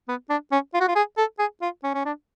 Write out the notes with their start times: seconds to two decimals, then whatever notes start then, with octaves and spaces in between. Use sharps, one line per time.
0.08 B3
0.30 D4
0.52 C#4
0.74 F4
0.81 F#4
0.88 F4
0.96 G#4
1.18 A4
1.39 G#4
1.62 F4
1.84 C#4
1.94 C#4
2.06 D4